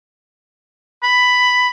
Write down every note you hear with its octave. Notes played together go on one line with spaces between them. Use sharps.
B5